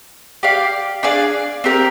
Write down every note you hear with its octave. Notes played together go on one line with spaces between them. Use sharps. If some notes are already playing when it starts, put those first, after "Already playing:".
G4 D5 F5
D4 G#4 D5 F5
C4 G4 A#4